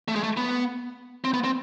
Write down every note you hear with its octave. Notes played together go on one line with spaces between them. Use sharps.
A3
G#3
A3
B3
C4
B3
C4